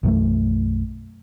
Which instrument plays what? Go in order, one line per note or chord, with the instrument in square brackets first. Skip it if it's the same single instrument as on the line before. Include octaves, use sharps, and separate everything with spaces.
[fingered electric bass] B1 F#2 E3 A3